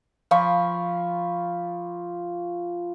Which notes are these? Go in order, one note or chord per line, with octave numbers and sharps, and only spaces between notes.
F3 F4 B5 C#6